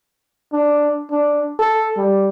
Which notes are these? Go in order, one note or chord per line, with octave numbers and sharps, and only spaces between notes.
D4
D4
A4
G3